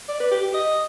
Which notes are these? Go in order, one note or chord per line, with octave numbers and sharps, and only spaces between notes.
D5
B4
G4
G4
D#5